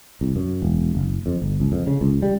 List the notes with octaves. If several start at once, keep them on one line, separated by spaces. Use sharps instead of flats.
C2
F#2
E1
F#1
F2
G1
C#2
F2
C#3
C#2
G3